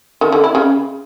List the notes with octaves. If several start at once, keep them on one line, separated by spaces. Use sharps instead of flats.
D#3
D3
E4
C#3